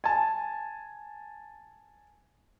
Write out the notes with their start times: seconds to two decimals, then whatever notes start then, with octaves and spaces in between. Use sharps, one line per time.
0.04 G#5 A5